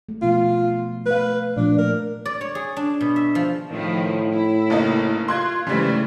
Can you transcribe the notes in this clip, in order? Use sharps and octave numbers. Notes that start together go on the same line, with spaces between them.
A3
B2 F3 B3 F4
A3 B4 F5
A#2 F3 A3 D4
A#4
D5
C#5
G#4
D4
B2
E5
F3
A2 D#3 F3 E4
E4
F#1 A#3 D#4
F4 C6 F#6 G#6
G#2 C#3 E3 G3 A3